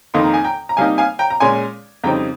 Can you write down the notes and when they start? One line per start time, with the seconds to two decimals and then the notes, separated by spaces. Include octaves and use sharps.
0.14 F2 D#3 A#3 D#4 C6
0.24 A#5
0.34 G#5
0.44 G5 A#5
0.69 A#5
0.77 C3 G3 A#3 D#4 F5 G#5
0.98 F5 G#5
1.19 G5 A#5
1.30 A#5
1.40 A#2 G#3 C#4 G#5 C6
2.04 F2 C#3 G3 C4 D#4 G5 A#5